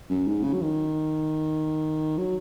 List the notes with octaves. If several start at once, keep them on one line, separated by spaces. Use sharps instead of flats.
F#2
G#2
C#3
F#3
D#3
F#3